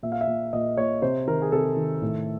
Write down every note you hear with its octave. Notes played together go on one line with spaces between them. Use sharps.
A#2 E5
F5
E5
A#2
A#2 D#5
A#2 C#5
C3 C5
D#3 A#4
G#4
C3 A4
D#3
A2